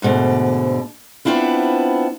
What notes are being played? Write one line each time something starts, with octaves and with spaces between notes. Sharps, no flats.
D2 G#2 B2 D3
B3 C4 D4 E4 F4